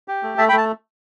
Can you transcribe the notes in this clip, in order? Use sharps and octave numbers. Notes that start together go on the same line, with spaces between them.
G4
A3
A3 E5 A5
G5 B5
A3
A5